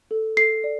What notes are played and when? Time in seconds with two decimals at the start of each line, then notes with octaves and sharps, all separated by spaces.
0.11 A4
0.37 A4 C7
0.64 D5